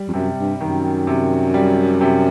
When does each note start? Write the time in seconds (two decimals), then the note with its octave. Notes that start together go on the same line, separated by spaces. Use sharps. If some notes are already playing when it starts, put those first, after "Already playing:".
Already playing: G3
0.08 F2
0.13 F#2 C3
0.38 G2
0.61 F#2 D#3
1.07 C3
1.54 G3
2.01 C3